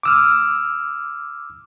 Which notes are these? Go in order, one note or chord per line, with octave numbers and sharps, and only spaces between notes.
D6 E6 F6